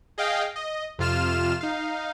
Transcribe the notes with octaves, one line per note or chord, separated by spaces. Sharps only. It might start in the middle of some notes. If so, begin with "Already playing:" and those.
G#4 D#5 F5 G5
D#5
F2 C3 F4 F6 E7
D#4 F5